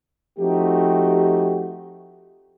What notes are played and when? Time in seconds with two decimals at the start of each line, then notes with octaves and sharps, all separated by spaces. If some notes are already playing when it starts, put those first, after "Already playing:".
0.39 F3 A3 C4 D#4 F#4 G4